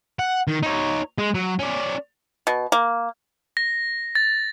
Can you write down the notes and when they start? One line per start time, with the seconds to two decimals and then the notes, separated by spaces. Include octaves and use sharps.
0.19 F#5
0.48 D#3
0.63 D#4 C#5
1.18 G#3
1.34 F#3
1.59 C#4 D5
2.47 B2
2.72 A#3
3.57 A#6
4.15 A6